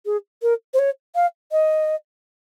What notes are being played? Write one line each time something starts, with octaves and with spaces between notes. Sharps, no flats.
G#4
A#4
C5
C#5
F5
D#5